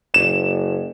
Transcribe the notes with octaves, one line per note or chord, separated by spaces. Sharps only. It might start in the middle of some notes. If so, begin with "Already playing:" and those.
F#1 E7